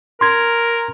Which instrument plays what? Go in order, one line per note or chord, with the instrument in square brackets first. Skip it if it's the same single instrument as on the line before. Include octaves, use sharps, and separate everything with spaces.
[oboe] A#4 [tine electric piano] C6 G#6